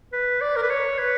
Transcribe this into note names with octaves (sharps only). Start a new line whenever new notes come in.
B4
D5
A#4
B4
C#5
B4